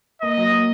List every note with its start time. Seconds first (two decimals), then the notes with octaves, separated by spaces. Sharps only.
0.22 A#3 D#5
0.37 F#3
0.51 A#3